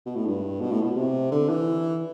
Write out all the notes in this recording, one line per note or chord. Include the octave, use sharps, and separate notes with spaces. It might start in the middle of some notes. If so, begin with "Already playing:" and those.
B2
A2
G2
B2
A2
B2
C3
D3
E3